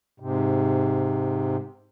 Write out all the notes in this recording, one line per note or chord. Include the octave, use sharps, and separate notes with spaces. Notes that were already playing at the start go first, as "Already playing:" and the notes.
G#2 C3